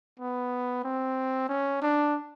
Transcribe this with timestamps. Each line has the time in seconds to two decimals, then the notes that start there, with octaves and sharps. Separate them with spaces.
0.19 B3
0.84 C4
1.49 C#4
1.82 D4